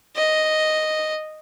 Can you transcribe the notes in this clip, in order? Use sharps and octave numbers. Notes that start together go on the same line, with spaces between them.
D#5